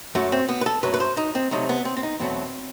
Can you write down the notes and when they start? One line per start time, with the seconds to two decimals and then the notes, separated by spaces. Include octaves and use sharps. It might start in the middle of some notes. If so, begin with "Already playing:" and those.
0.15 F#2 F#3 A3 F#4
0.32 C4
0.49 B3
0.61 B4
0.66 A4
0.83 F#2 F#3 A3 B4
0.94 B4
1.00 C5
1.17 D#4
1.35 C4
1.51 C2 C3 F#3 A3 D#4
1.69 B3
1.85 C4
1.97 C4
2.03 D#4
2.19 E2 B2 F#3 A3 C4